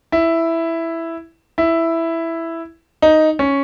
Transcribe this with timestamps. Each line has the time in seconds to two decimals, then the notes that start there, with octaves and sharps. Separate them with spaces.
0.12 E4
1.58 E4
3.02 D#4
3.39 C#4